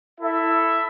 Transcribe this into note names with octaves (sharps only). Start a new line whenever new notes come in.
E4 A4 E5